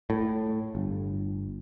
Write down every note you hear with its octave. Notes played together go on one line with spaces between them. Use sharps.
A2
G1